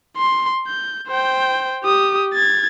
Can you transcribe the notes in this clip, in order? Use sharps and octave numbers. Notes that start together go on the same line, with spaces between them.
C6
G6
C5 G5
G4 D#6
G#6 A6